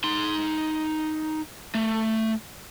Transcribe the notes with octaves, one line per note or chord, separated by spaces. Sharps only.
D#4 C6
A3